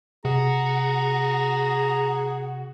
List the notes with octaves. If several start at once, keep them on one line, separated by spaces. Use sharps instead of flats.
C3 F#4 G#4 A#5